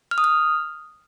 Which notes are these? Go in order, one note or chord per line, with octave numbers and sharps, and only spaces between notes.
F6
D#6
F6